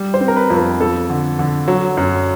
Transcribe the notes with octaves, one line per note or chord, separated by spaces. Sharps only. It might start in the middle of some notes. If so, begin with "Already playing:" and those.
Already playing: G3
C5
C4
A#4
B4
F2
A#4
F2 A4
D3
D3
F#3
F#2